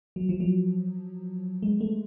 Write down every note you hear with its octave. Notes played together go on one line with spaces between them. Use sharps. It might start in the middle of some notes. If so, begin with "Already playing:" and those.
F#3
F3
F#3
G#3
A3